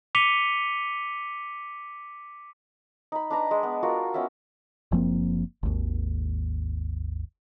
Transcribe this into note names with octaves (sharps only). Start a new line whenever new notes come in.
D6 B6 C#7 D#7 F7 G7
D#4 B5
D4 B4 A#5
G#3
B3
F4 F#4 A#4 D5
B3 C#4 D#4 E5
F#1 F3 A#3 C4
G#1 D#2